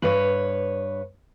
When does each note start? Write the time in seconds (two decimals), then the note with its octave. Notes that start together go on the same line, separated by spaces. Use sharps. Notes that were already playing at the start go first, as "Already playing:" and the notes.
0.02 G2 B4 C#5